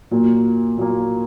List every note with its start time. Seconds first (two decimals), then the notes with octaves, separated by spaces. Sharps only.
0.11 A#2 F#3 A#3
0.78 A#2 F#3 A#3